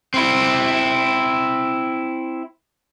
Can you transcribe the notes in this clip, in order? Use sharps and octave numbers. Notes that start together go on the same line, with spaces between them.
C4 E4